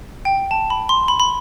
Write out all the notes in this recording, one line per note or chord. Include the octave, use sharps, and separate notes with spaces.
G5
A5
B5
C6
B5
B5